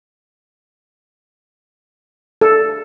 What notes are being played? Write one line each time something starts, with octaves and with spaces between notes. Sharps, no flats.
A4